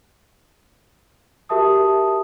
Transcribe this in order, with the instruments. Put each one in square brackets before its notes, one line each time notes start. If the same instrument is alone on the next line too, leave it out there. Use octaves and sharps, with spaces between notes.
[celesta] F#4 G4 A#4 E5 A5 D#6